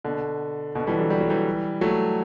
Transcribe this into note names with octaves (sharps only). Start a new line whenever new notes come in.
B2 D3
B2 D3
E3 G3
D3 F#3
G3
F#3
E3 G3
F#3 A3